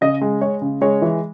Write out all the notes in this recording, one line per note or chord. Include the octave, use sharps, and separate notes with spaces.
C#3 D#5
G#3
G#3 C#5
C#3
G#3 C#5
E3